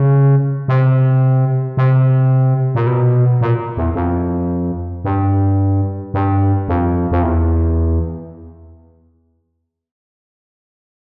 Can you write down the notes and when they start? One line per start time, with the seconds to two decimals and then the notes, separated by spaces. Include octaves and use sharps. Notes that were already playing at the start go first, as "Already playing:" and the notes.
Already playing: C#3
0.68 C3
1.77 C3
2.75 A#2
2.87 B2
3.41 A#2
3.77 E2
3.95 F2
5.05 G2
6.14 G2
6.68 F2
7.12 F2
7.23 E2